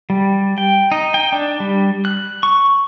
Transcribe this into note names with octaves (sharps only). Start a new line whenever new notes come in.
G3
G5
D#4
G5
D4
G3
F#6
C#6